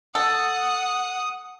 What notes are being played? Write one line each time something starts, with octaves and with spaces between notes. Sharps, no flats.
A4 F#5 D#6